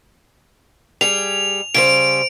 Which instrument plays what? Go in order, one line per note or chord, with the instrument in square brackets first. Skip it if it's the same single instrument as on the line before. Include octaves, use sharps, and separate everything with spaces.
[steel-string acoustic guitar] G3 G#4 [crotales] F7
[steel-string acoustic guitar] C#3 G3 C5 [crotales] D7